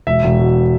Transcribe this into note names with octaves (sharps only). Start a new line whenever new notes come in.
E1 E5
E1
B2